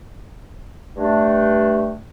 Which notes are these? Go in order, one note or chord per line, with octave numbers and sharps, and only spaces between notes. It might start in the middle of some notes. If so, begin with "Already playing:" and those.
G2 A3 D4